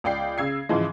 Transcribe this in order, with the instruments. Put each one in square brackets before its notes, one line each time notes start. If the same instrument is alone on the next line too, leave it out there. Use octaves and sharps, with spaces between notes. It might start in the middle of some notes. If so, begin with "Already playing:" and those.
[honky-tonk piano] C#2 D5 G5 C7
C#3 E6 G#6 C7
G#2 C#3 E3 F3 G#3